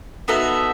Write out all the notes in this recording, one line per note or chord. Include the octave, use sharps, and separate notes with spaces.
B3 D#4 F#4 A4 E5